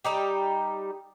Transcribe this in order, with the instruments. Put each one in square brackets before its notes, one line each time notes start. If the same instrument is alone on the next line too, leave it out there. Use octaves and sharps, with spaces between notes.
[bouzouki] G3 D#4 G4